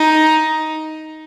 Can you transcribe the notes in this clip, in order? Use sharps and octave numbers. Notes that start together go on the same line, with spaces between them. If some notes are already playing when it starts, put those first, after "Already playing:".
Already playing: D#4